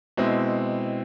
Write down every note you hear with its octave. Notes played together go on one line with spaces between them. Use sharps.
B2 G#3 C4 E4